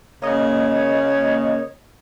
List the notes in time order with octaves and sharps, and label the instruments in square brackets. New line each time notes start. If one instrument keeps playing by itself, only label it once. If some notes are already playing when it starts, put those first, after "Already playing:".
[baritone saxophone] C#3 [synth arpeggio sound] A#3 D#5 [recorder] C#5